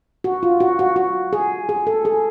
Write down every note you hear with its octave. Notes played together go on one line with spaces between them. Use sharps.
F#4
F4
F#4
F#4
F#4
G#4
G#4
A4
G#4